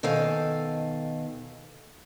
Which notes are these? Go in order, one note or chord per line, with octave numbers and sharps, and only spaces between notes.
B2 D#3 A4 F5 G#5